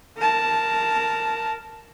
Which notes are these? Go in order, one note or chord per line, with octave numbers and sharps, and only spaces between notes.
A#4 A5